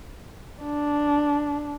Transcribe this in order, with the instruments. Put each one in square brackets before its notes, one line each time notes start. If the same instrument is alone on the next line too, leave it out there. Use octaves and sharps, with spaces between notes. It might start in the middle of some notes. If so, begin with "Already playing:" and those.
[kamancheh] D4